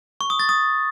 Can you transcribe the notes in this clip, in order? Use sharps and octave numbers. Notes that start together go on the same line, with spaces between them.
C#6
D#6
A6
D#6